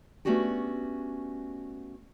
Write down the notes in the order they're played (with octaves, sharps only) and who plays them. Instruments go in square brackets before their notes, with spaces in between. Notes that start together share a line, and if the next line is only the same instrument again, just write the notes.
[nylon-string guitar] A3 B3 C#4 D4 F#4 G4